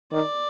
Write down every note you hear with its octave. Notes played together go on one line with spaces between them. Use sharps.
D#3 D5